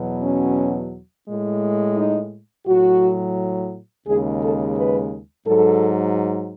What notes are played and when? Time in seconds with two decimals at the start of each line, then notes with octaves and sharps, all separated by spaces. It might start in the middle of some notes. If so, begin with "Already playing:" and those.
Already playing: E2 B2 F#3
0.23 C#4
1.27 A2 G#3
1.97 D#4
2.67 A2 F#3 F#4
4.07 D#2 C#3 G#3 G#4
4.42 A4
4.76 B4
5.46 G#2 F#3 A4